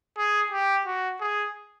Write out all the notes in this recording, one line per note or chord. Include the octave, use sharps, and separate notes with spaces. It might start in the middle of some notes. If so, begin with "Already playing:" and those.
G#4
G4
F#4
G#4